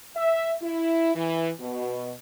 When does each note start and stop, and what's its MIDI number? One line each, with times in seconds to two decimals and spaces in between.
0.16 0.52 76
0.62 1.12 64
1.15 1.49 52
1.60 2.12 47